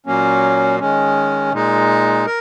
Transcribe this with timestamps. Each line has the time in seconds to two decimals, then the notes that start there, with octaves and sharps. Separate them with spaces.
0.06 A#2 F#3 A#3 C#4
0.80 D#3 G#3 C#4
1.52 A#2 G#3 D#4
2.26 A#4